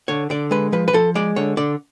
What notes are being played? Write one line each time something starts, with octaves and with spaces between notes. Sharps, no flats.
D3 C#5
D3 D5
G#3 B4
F3 B4
B4
F3 A4
G#3 D5
D3 C#5
D3 D5